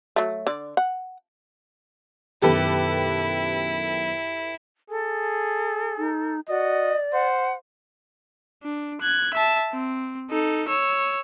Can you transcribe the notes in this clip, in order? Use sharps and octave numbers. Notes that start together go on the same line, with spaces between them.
F#3 A3
D3 D5
F#5
F#2 B2 D#3 E4 G4 A4 B4
G#4 A4
D#4
F#4 D5 D#5
C5 F#5
D4
F#6 G#6
E5 A5
C4
D#4 A4
C#5 E6